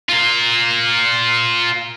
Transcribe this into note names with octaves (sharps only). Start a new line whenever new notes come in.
F4 A#4